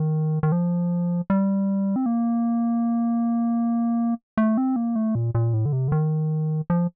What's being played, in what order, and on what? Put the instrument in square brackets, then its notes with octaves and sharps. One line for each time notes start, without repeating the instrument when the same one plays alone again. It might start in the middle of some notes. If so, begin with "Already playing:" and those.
Already playing: [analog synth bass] D#3
D#3
F3
G3
C4
A#3
A3
C4
A#3
A3
A#2
A#2
A2
D3
C3
D3
D#3
F3